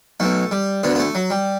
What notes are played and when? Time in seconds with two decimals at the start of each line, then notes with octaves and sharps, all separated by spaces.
0.20 B1 B2 A3
0.51 G3
0.83 D2 D3 B3
0.95 B3
0.99 A3
1.15 F#3
1.30 G3